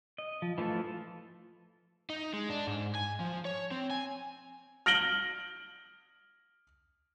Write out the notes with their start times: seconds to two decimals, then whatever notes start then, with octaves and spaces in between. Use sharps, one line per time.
0.18 D#5
0.42 F3
0.58 E3 F3 A3 F4 A4
2.10 D#4
2.33 G#3
2.49 D4
2.67 G#2
2.95 G#5
3.20 F3
3.45 C#5
3.71 C4
3.91 G#5
4.86 F6 A#6 D7 F#7 G7